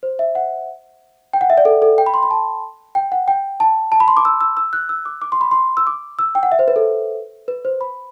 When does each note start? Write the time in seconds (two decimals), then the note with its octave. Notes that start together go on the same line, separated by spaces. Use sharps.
0.03 C5
0.19 E5
0.35 F#5
1.33 G5
1.41 F#5
1.50 E5
1.58 D5
1.65 A4
1.82 A4
1.98 G5
2.06 B5
2.14 C6
2.23 B5
2.31 A5
2.95 G5
3.12 F#5
3.28 G5
3.60 A5
3.92 A5
4.00 B5
4.08 C6
4.17 D6
4.25 E6
4.41 E6
4.57 E6
4.73 F#6
4.89 E6
5.05 D6
5.22 D6
5.32 C6
5.41 B5
5.51 C6
5.77 E6
5.87 D6
6.19 E6
6.35 G5
6.43 F#5
6.52 E5
6.59 C5
6.68 B4
6.76 A4
7.48 B4
7.65 C5
7.81 B5